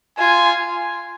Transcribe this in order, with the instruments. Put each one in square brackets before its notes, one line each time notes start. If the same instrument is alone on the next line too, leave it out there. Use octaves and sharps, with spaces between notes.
[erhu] F4 [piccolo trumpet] G#5